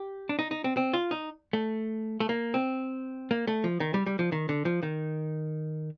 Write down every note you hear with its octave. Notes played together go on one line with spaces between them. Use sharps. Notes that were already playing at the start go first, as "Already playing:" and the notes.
Already playing: G4
D4
D#4
D#4
C4
C4
F4
D#4
A3
A3
A#3
C4
A#3
A3
F3
D#3
G3
G3
F3
D#3
D3
F3
D#3